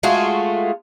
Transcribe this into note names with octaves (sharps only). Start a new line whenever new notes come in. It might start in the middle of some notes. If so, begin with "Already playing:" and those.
G#3 A3 F4 F#4